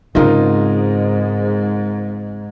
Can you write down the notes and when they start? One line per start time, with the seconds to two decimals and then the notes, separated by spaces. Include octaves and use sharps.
0.15 G#2 C#3 C4 D#4 F4 A#4